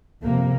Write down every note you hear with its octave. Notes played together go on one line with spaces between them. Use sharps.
F2 C3 A#3